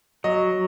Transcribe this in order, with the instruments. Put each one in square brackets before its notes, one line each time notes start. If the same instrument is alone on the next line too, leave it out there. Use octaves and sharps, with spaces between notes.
[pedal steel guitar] F#3 [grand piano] D#5